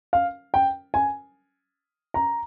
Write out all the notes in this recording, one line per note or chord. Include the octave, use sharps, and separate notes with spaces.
F5
G5
G#5
A#5